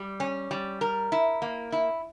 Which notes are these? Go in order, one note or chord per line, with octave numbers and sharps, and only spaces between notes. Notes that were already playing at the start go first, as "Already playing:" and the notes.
Already playing: G3
C#4
G3
A#4
E4
A#3
E4